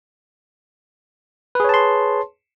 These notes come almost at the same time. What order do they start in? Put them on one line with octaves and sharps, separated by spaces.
B4 G#4 C#5 A5 C6